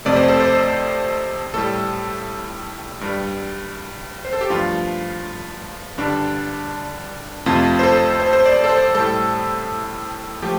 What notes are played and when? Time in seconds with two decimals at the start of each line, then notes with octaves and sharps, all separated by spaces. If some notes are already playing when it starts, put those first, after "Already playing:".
0.05 F2 C3 A3 D5
0.17 C5
0.28 A4
0.40 C5
1.54 A2 G3 A4
3.01 G2 G3
4.25 C5
4.33 A4
4.41 G4
4.50 G2 F3 A3 F4
5.98 G2 D3 G3 D4
7.46 F2 C3 A3 F4
7.79 C5
7.83 A4
8.20 C5
8.33 C5
8.46 D5
8.64 A4
8.69 C5
8.95 A2 G3 A4
10.42 F3 A3 G4